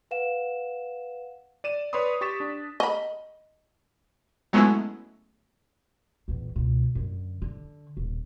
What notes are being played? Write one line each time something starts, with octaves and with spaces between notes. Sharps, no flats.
B4 F5 F#5 E7
D5 D#7 E7
B4 C#5 D5 B5 C6 D#6
G4 C#6 A6 B6 E7
D4
D#5 B5
F#3 G#3 A3 B3 C#4 E4
A#1 E2
C#2 B2
F#2 D3
D3
D#1